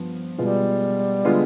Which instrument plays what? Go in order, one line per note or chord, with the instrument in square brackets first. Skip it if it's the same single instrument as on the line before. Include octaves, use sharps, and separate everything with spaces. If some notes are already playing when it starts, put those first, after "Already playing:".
Already playing: [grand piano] G2 F3 B3
[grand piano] B2 G#3 B3 F4 [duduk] G3
[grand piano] D3 G#3 B3 F4